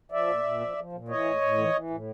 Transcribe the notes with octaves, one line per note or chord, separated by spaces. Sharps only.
F3 D5 E5
A#2
A#2
F3
F3
A#2
E3 C#5 D#5
A2
A2
E3
E3
A2